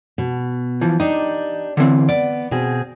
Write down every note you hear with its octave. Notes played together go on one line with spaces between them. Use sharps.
B2
E3 F3
D4 D#4 G4
D3 E3 C4
B3 D5
B2 C4 G#4